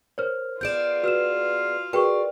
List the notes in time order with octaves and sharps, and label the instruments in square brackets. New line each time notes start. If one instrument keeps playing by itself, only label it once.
[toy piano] A#4 C#5 [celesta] C5 F6
[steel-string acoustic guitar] B3 G#4 D5 [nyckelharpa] F4 F5 [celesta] G6 D7 E7
[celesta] F#4 F6 E7 [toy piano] B4 E6
[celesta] F#4 G#4 C#6 [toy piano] A#4 B4 G5 [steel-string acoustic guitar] D5